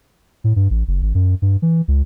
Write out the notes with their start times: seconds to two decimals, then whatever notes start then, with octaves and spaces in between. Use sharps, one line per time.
0.44 A2
0.56 G2
0.70 A1
0.88 F#1
1.02 G#1
1.15 F#2
1.42 G2
1.62 E3
1.88 C#2